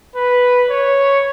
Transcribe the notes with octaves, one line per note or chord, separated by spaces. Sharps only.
B4
C#5